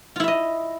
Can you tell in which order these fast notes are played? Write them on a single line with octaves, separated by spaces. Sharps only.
F4 E4 E5 D#5